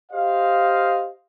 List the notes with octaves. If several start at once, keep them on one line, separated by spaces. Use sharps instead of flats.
G4 C5 D#5 F5